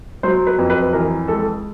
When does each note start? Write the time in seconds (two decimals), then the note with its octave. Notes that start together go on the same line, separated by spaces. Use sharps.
0.23 F#3 C5
0.47 B4
0.59 F2
0.70 B4
0.93 E3 A#4
1.28 G#3 A4